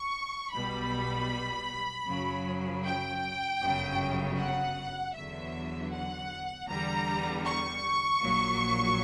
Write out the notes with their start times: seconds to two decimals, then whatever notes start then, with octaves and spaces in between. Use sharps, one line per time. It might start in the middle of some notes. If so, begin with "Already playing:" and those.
Already playing: C#6
0.54 B1 B2 G3 B5
2.07 F#2 C#3 F#3
2.85 G5
3.61 G1 F#2 C#3 F#3
4.39 F#5
5.15 E2 D3 F#3 E5
5.92 F#5
6.69 E2 D3 G3 A#5
7.45 C#6
8.23 A#1 A#2 F#3